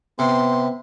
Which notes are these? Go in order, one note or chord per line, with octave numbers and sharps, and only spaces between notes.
C3 B3 C6